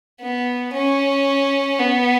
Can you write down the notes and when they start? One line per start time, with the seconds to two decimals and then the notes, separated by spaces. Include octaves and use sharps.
0.21 B3
0.73 C#4
1.79 B3